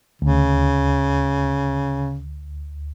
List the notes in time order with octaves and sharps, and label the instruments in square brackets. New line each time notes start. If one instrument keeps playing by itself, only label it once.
[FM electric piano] D2 [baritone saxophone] C#3